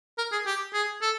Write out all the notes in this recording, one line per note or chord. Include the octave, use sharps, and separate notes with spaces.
A#4
G#4
G4
G#4
A4